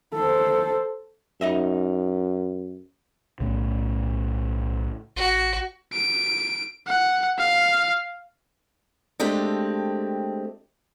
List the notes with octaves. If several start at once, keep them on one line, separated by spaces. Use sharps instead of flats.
A4 C5
F#2 D#4 D#5 E5
B1 A2 C#3
A1 F#4
D7
F#5
F5
G#3 A3 C4 D4 G4